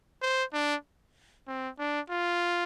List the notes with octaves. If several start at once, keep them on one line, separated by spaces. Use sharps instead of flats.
C5
D4
C4
D4
F4